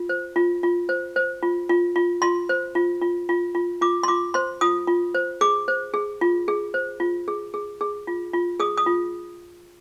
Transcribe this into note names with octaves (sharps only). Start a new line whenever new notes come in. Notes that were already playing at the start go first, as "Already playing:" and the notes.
Already playing: F4
C5
F4
F4
C5
C5
F4
F4
F4
F4 C6
C5
F4
F4
F4
F4
F4 D6
C6
F4 D6
C5 C6
F4 D#6
F4
C5
G#4 D6
C5
G#4
F4
G#4
C5
F4
G#4
G#4
G#4
F4
F4
G#4 D#6
D#6
F4